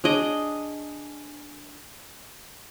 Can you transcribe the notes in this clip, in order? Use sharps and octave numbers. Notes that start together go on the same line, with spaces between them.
D4 G#4 D#5 D6